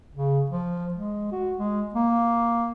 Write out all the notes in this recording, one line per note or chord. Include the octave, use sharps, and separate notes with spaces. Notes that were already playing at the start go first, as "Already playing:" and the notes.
C#3
F3
G#3
F#4
G#3
A#3